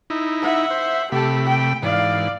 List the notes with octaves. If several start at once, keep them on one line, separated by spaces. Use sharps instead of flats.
D#4 E4
E5 F#5
C5
C3 A3 G4 A4 B5
G5
G#2 E3 D5 F5